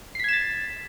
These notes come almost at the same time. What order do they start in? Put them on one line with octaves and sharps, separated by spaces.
C7 B6 G#6 E7 A6